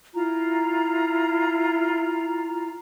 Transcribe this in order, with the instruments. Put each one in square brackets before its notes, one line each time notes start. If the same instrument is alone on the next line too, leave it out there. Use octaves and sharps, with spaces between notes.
[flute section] E4 F4 A#5